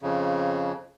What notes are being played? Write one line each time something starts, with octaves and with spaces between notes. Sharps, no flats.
F2 C#3